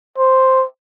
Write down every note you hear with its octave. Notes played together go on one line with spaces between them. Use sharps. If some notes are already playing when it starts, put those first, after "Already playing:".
C5